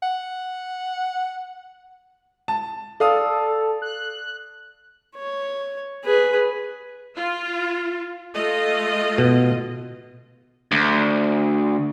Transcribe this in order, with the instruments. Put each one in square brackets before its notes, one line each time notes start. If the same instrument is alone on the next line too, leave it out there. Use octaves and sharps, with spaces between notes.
[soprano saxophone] F#5
[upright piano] A5
[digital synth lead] A4 [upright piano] D5 F5 D#6
[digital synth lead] F#6
[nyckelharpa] C#5
G#4 B4
[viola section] F4
A3 F4 D#5
[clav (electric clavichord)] B2
[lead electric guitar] D2